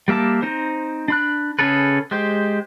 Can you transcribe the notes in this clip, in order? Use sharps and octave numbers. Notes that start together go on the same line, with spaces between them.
G3 A#3 E5 A5 D6
C4 D#4 C5
D4 B5 F#6
C#3 C#4 G#4 A4 B4
G#3 G4 C5